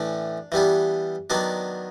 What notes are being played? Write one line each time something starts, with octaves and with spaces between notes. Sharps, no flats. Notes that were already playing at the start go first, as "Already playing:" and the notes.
Already playing: A2 E3 A3 C#4 D4 D5
E3 G3 B3 D4
D#3 F#3 B3 D4 D5